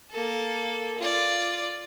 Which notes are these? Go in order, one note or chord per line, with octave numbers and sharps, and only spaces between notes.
A#3 A4
F4 D5